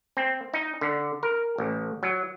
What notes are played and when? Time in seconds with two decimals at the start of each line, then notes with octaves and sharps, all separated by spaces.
0.17 C4
0.54 D#4
0.81 D3
1.23 A#4
1.58 A1
2.03 F#3